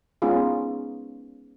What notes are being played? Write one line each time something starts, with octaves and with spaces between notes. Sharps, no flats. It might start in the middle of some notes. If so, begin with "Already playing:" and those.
G#3 B3 C#4 D#4 F4 G#4